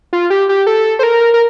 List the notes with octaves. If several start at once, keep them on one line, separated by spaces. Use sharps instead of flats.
F4
G4
G4
A4
C5
A#4
A#4